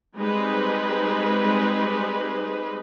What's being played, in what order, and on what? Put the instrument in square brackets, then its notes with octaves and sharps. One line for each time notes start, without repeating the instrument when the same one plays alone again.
[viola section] G3 G#3 C4 D#4 G#4 B4